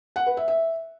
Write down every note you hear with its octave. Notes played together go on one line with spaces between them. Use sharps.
F#5
B4
E5
E5